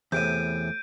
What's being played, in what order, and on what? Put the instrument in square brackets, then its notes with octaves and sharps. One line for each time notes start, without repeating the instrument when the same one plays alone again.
[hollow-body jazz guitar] E2 [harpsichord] A2 C3 [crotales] G6 D7 D#7